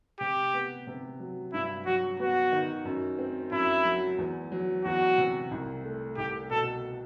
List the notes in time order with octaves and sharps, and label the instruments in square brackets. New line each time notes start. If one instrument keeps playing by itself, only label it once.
[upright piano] C3 [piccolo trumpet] G4
[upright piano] B3
C3
F#3
[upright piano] G2 [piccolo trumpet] E4
[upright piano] F#3 [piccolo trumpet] F#4
[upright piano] B3 [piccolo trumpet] F#4
[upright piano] D#3
F#2
C4
[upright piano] F#2 [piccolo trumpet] E4
[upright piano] F#3
E2
F#3
[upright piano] E2 [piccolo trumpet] F#4
[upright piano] C3
C2
A3
[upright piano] C2 [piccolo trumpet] G4
[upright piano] B2 [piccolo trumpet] A4